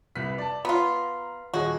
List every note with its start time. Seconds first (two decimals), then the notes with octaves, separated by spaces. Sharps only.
0.16 C2 B4 B6
0.38 D5 A5
0.65 B3 F4 A#5
1.54 D#1 F#4 G#4 D#5